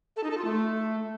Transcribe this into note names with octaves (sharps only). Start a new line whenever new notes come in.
A4
D#4
A4
F4
A3